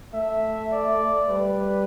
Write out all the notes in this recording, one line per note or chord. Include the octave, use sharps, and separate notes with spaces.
A3 E5
D5
G3 B4